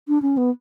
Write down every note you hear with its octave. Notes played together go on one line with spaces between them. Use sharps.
D4
C#4
B3